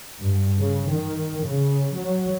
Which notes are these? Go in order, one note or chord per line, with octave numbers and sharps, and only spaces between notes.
G2
C#3
D#3
C#3
F#3